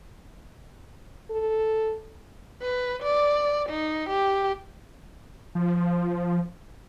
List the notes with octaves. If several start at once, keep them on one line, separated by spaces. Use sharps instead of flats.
A4
B4
D5
D#4
G4
F3